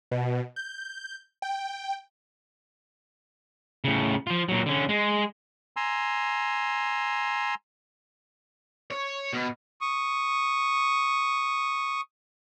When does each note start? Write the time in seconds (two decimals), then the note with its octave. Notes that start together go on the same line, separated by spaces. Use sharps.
0.11 B2
0.56 G6
1.42 G5
3.84 A2 C#3
4.27 F3 F4
4.49 A#2 F#3
4.66 D3 C#4
4.89 G#3
5.77 G#5 A#5 C6 E6
8.91 C#5
9.33 B2
9.81 C#6 D#6